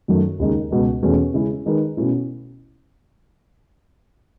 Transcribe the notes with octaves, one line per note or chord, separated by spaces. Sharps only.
F#2 D#3 F#3 A3
D#2 C#3 G#3 D#4
C#2 B2 G#3
E2 B2 A3 C#4 G#4
C#3 G#3 C#4 E4 G#4
D#3 G#3 D#4 G#4 B4
B2 A3 C#4 E4